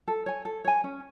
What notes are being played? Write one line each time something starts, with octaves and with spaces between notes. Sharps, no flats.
A4
C#5 G#5
A4
C#5 G#5
C#4